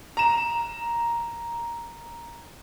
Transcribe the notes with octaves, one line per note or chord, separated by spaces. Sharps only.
A#5 E7